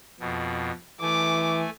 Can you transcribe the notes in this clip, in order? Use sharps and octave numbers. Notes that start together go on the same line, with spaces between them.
F2 B2
E3 A3 G#5 D6